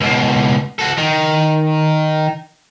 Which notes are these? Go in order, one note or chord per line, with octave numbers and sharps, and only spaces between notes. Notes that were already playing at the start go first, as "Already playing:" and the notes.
C#2 B2
F#4 A4
D#3